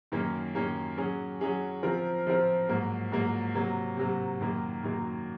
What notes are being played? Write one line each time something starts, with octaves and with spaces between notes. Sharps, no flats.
F#2 D#3 A#3 C#4
F#2 D#3 A#3 C#4
F#3 C#4 G#4
F#3 C#4 G#4
F3 C4 F4 A#4
F3 C4 F4 A#4
G#2 F#3 A#3
G#2 F#3 A#3
C3 F#3 A#3
C3 F#3 A#3
F#2 D#3 F#3 A#3
F#2 D#3 F#3 A#3